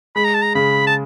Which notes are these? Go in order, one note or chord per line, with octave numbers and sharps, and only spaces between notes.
G#3 B5
A#5
A5
A#5
C#3 B5
A5